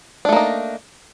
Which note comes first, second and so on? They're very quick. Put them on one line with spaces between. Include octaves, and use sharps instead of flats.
D4 A3 A#3 D#4